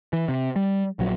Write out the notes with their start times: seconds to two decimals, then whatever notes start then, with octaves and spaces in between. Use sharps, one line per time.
0.13 E3
0.29 C3
0.56 G3
0.99 A#1 F#3